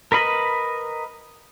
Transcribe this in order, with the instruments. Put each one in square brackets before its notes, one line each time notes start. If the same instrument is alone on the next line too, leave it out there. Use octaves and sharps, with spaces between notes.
[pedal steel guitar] A#4 B4 D#5 B5